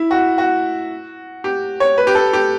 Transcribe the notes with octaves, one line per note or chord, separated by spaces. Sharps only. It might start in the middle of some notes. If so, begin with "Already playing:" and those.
Already playing: E4
F#4
F#4
G4
C#5
B4
G4
A4
G4